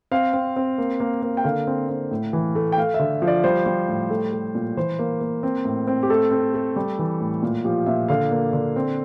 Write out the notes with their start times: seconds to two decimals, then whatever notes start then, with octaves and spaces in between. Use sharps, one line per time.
0.11 C4 F5
0.33 C4
0.56 C4
0.78 A#3
1.00 A#3
1.22 A#3
1.37 G5
1.44 D3 F5
1.67 C4
1.89 C4
2.11 A2
2.33 E3
2.55 A3
2.72 G5
2.77 A3 F5
2.94 E5
2.99 D3
3.22 F3
3.27 D5
3.44 G3 C5
3.66 G3
3.88 A2
4.10 A3
4.33 A3
4.55 A#2
4.77 E3 C5
4.99 A#3
5.21 A#3
5.43 C4
5.65 A2
5.87 C4
6.03 G4
6.10 A3 A4
6.31 C4
6.54 A3
6.76 G3
6.99 E3
7.21 A2
7.43 A#2
7.65 F3 G4
7.86 A#2 E5
8.08 D3 F5
8.31 A#3
8.53 D3
8.76 C4